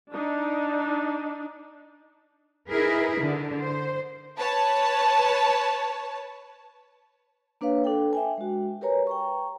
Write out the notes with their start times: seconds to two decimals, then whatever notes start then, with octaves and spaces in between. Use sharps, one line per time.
0.10 D4 D#4
2.69 D#4 E4 G#4 A#4 B4
3.18 D3
3.59 C5
4.38 B4 C#5 A5
7.61 A#3 D4 B4 C#5 F5
7.84 D4 A4 G5
8.13 E5 G5 G#5
8.38 G#3 F#4
8.81 G4 A#4 B4 C#5 G#5 A#5
9.07 G5 A#5 C#6